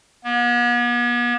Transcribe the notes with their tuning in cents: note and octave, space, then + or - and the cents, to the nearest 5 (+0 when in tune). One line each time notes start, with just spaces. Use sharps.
B3 -45